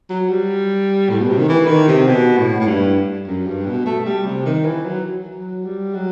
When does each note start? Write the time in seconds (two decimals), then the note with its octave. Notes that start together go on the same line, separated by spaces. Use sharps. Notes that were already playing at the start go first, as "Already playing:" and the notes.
0.10 F#3
0.29 G3
1.10 A2
1.19 B2
1.29 C3
1.38 D#3
1.49 E3
1.67 D#3
1.88 C3
2.07 B2
2.37 A2
2.60 A2
2.68 G2
3.27 F#2
3.46 G2
3.67 B2
3.86 A3
4.06 G3
4.26 C3
4.46 D#3
4.65 E3
4.85 F#3
5.35 F#3
5.65 G3
5.95 F#3